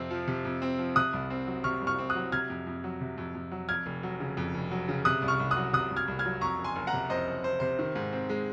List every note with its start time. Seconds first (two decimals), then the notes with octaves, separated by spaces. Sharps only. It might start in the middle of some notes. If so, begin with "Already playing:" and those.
Already playing: F2 C3 C4
0.11 F3
0.28 C3
0.45 F2
0.62 C4
0.78 F3
0.96 C3 D#6 F#6
1.13 C2
1.30 C4
1.47 F#3
1.64 C3 C#6 F6
1.81 C2
1.87 C#6 F6
1.99 C4
2.10 D#6 F#6
2.16 F#3
2.32 C3 F6 G#6
2.50 F2
2.67 F2
2.84 F#3
3.01 C3
3.18 F2
3.35 F2
3.52 F#3
3.69 F2 F6 G#6
3.86 F1
4.03 F#3
4.20 C#3
4.37 F2
4.54 F1
4.71 F#3
4.89 C#3
5.05 C3 D#6 F#6
5.22 C2
5.28 C#6 F6
5.40 C2
5.51 D#6 F#6
5.57 F#3
5.73 C3 D#6 F#6
5.91 C2
5.96 F6 G#6
6.08 C2
6.19 F6 G#6
6.25 F#3
6.41 F2 A#5 C#6
6.59 F#1
6.64 G#5 C6
6.76 F#1
6.87 F#5 A#5
6.93 C3
7.10 F2 C5 D#5
7.27 F#1
7.44 F#1 C5
7.60 C3 C5
7.79 D#3
7.96 G#2
8.13 C4
8.29 G#3